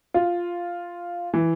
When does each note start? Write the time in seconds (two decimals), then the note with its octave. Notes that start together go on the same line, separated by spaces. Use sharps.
0.14 F4
1.34 E3